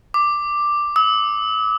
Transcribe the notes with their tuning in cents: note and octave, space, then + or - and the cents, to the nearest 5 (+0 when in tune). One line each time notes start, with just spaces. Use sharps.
D6 +5
E6 -45